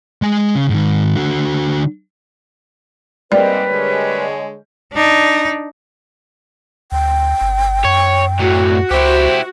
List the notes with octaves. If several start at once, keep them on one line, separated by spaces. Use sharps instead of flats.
G#3 G#5
C#3
G#2 D#3
D3 F#4
G#2 G3 A#3 C4 G4 B4 D5 D#5
D3 G#3 C#5
D4 D#4
D2 G5
G1
F#2 C#5
A2 F#3 F#4
C#2 E4 G4 C5